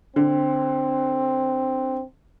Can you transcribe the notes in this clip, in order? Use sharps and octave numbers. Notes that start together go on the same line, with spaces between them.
D3 C4